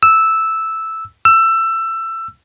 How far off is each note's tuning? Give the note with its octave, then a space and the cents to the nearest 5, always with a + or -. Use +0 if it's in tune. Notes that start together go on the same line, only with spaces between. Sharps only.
E6 -5
E6 +20